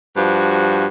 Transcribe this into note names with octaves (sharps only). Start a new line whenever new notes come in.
G2 F3 F#4